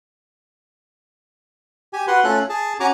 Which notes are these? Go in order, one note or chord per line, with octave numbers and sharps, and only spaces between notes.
G4 G#5
F#4 B4 F#5 C6
A3 C#4 F4 A4 F#6
G#4 A5
C#4 F#4 G#5 A#5 C#6 D6